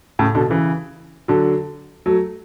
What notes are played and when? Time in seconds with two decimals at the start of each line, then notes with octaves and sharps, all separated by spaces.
0.19 A2 C#3
0.35 B2 D3
0.50 C#3 E3
1.28 D3 F#3
2.06 F#3 A3